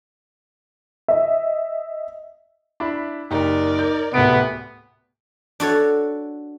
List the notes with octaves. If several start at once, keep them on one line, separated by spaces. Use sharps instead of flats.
D#5 E5
D4 E4 B5
F#1 D#4 G4 A#4 D5
G6
D1 C3 A3 B3 D7
D4 F#4 A4 C#5